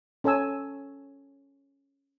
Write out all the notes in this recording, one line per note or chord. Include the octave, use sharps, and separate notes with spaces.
C#4 A4 C#5 G#5 E6